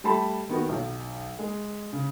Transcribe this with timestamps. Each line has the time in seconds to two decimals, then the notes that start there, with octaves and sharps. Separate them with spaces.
0.04 G3 A3 A5 B5
0.49 D#3 B3 F#4
0.69 B1
1.39 G#3
1.93 C#3